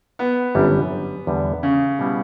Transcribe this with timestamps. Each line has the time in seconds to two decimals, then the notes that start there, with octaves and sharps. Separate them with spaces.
0.19 B3
0.55 G1 F#2 D3 G3 C#4
1.27 E2 D3 G3
1.63 C#3
1.99 B2 G3 B3 E4